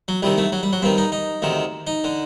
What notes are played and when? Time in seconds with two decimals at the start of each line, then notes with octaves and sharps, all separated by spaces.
0.08 F#3
0.22 C2 C3 D#3 G3
0.38 A3
0.52 F#3
0.63 G3
0.73 F#3
0.82 G2 D#3 C4
0.98 D#4
1.12 D#4
1.42 D2 C3 D#3
1.87 D#4
2.04 D3